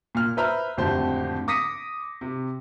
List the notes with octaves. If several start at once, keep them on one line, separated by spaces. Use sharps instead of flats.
A#2 F6
B4 C5 E5 A#5 B5 F6
G#1 F2 A2 D3 G4 C5
D6 D#6 A#6 B6 C#7 D#7
C3